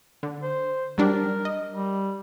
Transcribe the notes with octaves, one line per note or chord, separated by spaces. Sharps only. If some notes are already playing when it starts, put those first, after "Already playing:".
D3
C5
F#3 G3 D4 A#4
D#5
G3